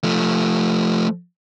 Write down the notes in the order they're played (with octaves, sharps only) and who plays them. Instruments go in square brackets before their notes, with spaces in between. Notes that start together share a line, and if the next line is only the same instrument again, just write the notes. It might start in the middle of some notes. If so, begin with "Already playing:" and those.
[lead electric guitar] F3 A3